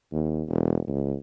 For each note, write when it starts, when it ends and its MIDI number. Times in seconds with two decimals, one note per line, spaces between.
0.12 0.43 39
0.48 0.79 28
0.88 1.15 37